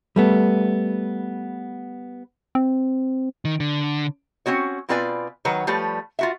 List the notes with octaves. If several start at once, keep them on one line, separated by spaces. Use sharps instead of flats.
G3 A3 B3
C4
D#3
D3
C4 C#4 F#4 C#5
B2 C4 F4 B4 D5 G#5
D#3 F#3 B4 C#5
F3 G3 A3 B4 C#5
F4 F#4 E5